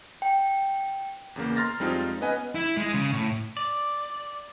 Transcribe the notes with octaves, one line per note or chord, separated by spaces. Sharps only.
G5
E2 C#3 A#3
A#5 C6 F6 A6 A#6
F2 G3 G#3 C4 D#4 F4
B3 C#4 B4 D#5 F#5 G#5
E4
G#3
C#3
A2
D5